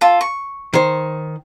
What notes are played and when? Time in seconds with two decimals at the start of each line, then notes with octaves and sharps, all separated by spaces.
0.01 F4 A4
0.21 C#6
0.73 D#3 C5